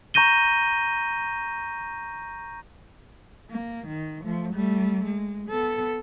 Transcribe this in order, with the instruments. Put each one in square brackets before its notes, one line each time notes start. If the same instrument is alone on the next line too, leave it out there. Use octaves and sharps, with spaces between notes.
[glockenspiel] A#5 C#6 G6 A#6 D#7 G7
[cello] A#3
D#3
F3 A3
G3 A3
G#3
B3 A4